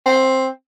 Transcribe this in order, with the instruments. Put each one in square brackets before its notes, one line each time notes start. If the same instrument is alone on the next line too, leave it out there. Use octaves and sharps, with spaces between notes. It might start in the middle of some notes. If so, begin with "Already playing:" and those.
[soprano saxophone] C4